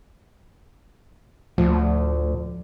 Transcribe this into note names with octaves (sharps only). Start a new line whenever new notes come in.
D2 A2 F3